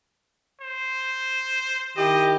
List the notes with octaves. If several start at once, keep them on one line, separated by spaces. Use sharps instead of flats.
C5
D#3 E4 G4 D#5